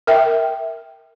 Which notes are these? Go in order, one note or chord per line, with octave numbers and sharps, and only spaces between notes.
A#4 E5 G5